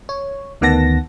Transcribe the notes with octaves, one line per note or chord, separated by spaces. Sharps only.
C#5
D2 D#3 B3 F#5 A5 A#6